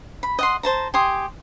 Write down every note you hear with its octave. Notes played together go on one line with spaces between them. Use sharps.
B5
D#5 F#5 C6
C5 A5 A#5
G4 G#5 C6 D#6